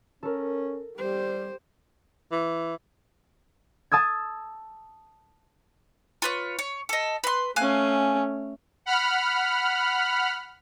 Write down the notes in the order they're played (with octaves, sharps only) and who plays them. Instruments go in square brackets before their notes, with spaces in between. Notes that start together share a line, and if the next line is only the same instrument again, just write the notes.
[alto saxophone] C#4 [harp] A4 A#4
[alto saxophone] G3 [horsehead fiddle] G4 C5
[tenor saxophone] E3
[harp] A5 D#6 E6 G#6
[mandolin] F4 B4 C#5
C#5
A4 D#5
B4 C6
[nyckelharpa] A3 C#4 [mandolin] F5 G#5 F#6
[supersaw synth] F#5 B5 F6